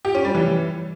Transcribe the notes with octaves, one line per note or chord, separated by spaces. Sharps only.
G4
C#4
G3
E3